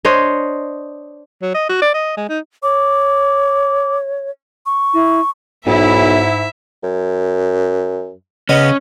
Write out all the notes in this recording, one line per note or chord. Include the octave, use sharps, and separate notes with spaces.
D4 C5 C#5 D#5
F#3
D#5
F#4
D5
D#5
G#3
D#4
C#5 D6
C#6
E4
B1 G#2 E4 E5
F#2
C#3 B3 C#4 D#5